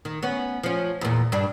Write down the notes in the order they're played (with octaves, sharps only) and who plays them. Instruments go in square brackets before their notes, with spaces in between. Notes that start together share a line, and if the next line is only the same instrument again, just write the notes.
[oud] D#3
B3 C#4
F3 C#4
E2 A#2
G2 D4